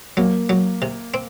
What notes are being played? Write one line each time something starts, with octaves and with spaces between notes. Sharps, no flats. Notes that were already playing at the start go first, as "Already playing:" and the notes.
F#3 A#3
F#3
C3
C4